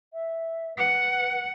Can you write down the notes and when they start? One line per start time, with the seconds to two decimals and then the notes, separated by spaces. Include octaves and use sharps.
0.13 E5
0.77 B4 F#5